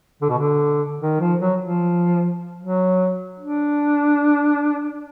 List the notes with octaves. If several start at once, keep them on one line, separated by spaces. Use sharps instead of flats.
D3
B2
D3
D#3
F3
F#3
F3
F#3
D4